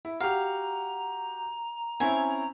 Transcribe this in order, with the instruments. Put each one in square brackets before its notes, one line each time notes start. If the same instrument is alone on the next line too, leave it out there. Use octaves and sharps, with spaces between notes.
[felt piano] E4
[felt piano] F#4 G4 [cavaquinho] F5 [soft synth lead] A#5
[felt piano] C4 C#4 E4 [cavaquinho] G#5